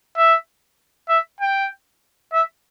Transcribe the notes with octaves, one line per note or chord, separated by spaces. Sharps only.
E5
E5
G5
E5